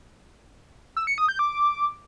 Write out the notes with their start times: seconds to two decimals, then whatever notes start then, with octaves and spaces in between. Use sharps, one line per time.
0.97 E6
1.07 C#7
1.18 D#6
1.29 G6
1.39 D6